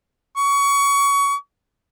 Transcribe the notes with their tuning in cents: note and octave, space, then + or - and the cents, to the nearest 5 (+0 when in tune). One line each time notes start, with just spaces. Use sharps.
C#6 +25